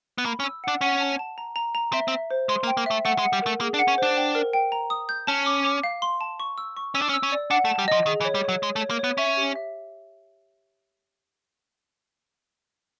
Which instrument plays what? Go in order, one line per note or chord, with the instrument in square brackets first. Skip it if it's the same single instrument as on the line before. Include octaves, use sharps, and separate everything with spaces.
[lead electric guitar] B3
[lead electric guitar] A#3 [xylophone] B5
[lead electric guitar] C#4
[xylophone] E6
[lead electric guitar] D4 [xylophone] F#5
[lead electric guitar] C#4 [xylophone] F#5
[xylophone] A5
A5
A#5
A#5
A#5
[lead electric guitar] C4 [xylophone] E5
[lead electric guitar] C4
[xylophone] E5
C5
[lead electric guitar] G#3 [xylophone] C6
[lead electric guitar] A#3
[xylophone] G5
[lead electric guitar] A#3
[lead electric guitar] A3 [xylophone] E5
[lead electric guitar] A3 [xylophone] F#5
[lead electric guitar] G#3
[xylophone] F#5
[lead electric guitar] G3
[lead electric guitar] A3 [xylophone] A#4
[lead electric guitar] A#3 [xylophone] G#4
[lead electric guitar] D4
[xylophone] F#5
[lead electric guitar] C#4
[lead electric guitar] D4 [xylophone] C5
[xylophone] G5
A#4
G5
A#5
D#6
G6
[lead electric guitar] C#4 [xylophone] A5
[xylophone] D6
D6
F5
C6
A5
C#6
E6
C#6
[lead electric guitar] C#4 [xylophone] E6
[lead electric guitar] D4
C#4
[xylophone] E6
[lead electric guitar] C#4
[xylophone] D5
[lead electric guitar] D4 [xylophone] F#5
[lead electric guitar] A3
[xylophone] A5
[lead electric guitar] G3
[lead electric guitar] F3 [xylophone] D#5
[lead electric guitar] D#3 [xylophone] G#4
[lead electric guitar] E3
[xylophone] C#5
[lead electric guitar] G3
[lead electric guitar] F#3 [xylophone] C#5
[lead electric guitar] G#3 [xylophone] C#5
[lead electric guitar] A3
[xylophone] C#5
[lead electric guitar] A#3
[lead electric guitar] B3 [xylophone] C#5
[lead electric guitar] C#4 [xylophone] E5
[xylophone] G4
E5